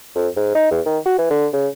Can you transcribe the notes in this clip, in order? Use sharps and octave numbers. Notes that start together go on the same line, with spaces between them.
F2
G#2
D#4
E2
D#3
F#4
E3
D3
C#3